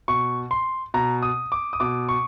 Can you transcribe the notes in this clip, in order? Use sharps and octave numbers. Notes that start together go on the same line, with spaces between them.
B2 C#6
C6
B2 A#5
D#6
D6
D#6
B2 D6
C#6